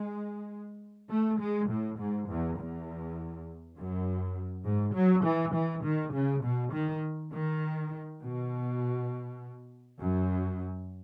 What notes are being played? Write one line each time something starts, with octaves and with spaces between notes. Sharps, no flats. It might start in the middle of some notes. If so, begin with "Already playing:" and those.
Already playing: G#3
A3
G#3
A2
G#2
E2
E2
F#2
G#2
F#3
E3
E3
D#3
C#3
B2
D#3
D#3
B2
F#2